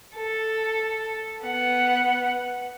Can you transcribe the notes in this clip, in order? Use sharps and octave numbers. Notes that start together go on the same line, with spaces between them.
A4
B3 F#5